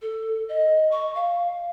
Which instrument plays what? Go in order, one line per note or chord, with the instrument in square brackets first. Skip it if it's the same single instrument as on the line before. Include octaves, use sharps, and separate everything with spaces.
[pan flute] A4
D#5
C#6
F5